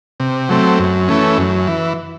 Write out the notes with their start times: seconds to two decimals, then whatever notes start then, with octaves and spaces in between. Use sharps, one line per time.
0.20 C3
0.49 F#3 A3 C4
0.79 F#2
1.08 E3 A3 C#4
1.38 F#2
1.67 E3